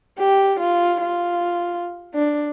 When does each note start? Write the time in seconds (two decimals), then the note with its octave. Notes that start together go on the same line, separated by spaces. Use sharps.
0.18 G4
0.60 F4
1.02 F4
2.14 D4